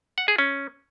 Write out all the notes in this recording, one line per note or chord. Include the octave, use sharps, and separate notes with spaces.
F#5
G#4
C#4